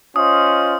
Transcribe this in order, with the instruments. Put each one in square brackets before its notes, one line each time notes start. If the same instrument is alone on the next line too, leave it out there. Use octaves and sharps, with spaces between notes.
[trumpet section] C#4 F4 C5 D#5 [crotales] D#6